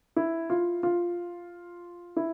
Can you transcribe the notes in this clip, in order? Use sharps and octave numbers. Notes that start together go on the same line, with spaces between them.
E4
F4
F4
E4